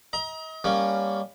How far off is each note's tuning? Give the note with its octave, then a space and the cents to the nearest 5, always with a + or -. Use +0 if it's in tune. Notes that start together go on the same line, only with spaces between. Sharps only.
D#5 +40 A#5 +30
G3 +20 A#3 +5 C#4 +15